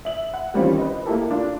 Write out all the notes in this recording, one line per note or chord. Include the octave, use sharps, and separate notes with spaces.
E5 F#7
F#5
D#3 E3 G3 C4 C#4 F4
B4 D#5
A#3 E4 G4 A4 A#4
D4 F4